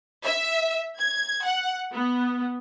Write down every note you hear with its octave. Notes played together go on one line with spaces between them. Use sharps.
E5
G#6
F#5
B3